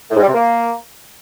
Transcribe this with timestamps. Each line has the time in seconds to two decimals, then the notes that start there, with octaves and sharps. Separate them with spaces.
0.11 A2
0.16 G#2
0.22 G3
0.28 C3
0.33 A#3